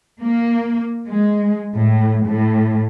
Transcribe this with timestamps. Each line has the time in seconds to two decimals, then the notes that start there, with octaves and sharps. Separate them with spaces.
0.21 A#3
1.07 G#3
1.75 A2
2.26 A2